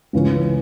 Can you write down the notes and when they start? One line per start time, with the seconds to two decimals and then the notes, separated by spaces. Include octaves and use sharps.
0.13 C#2 C#3 E3 C#4